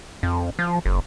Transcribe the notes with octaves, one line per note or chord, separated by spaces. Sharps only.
F2
F3
F#1